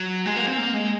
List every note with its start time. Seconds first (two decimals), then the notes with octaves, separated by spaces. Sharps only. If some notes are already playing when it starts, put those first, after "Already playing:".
Already playing: F#3
0.26 G#3
0.36 A#3
0.47 C4
0.58 A#3
0.74 G#3